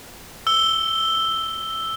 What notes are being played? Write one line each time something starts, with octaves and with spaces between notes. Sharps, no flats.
E6 G7